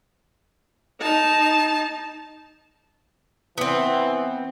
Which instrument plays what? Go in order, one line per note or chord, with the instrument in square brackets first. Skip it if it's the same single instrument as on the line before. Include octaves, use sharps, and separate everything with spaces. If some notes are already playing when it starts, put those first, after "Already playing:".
[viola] D#4 A5
[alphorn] E3 [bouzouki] B3 C4